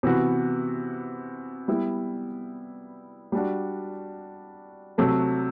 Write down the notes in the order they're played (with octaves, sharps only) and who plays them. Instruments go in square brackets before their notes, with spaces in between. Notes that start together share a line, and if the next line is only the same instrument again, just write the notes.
[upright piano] C3 E3 B3 F#4
G3 B3 E4
G3 D4 F#4
C3 F#3 A3